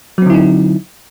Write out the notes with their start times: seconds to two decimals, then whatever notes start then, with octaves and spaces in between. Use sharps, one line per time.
0.18 F#3
0.22 C4
0.26 D3
0.30 E4
0.34 D#4